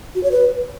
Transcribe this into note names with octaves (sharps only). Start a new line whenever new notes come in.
F#4
C#5
B4